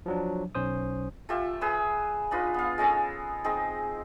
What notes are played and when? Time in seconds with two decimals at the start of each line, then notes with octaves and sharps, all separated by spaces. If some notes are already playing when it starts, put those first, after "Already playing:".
0.06 F3 F#3 D4
0.55 B1 C#4 C5 D#6
1.29 A3 F4 G4 E5
1.61 G#4 B4 E6
2.31 D4 D#4 F4 B4
2.54 B3 F5
2.78 G#3 C#4 D#4 A4
3.44 G#3 C4 D#4